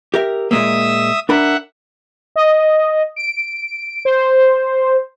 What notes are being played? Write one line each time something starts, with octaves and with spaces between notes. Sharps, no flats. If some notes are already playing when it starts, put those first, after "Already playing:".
G4 A#4 E5
A#2 G#3 A#3 E5 D#6 E6
D4 A#4 E5 F#5 B5
D#5
D7
C5